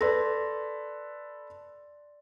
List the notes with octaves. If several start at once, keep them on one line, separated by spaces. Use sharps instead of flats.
A4 B4 D5 C6 A#6